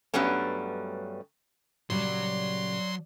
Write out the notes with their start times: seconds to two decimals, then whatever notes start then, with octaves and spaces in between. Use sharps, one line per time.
0.14 G2 F#3 G3 A3 B3 C#4
1.90 A#2 C#3 F#3 G3 D5 C6